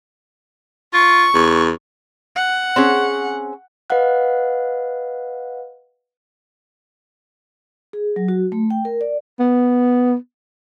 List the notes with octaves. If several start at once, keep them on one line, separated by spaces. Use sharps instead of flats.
F4 C#6
E2
F#5
C4 C#4 G#4
B4 D#5 F5 F#5 F#6
G#4
F#3
F#4
A3
G5
A#4
D5
B3